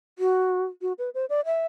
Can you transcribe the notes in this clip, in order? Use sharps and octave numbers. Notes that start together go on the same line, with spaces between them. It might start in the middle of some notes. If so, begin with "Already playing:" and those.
F#4
F#4
B4
C5
D5
E5